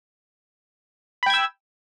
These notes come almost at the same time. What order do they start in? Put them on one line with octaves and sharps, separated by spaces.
B5 G5 G#6 E6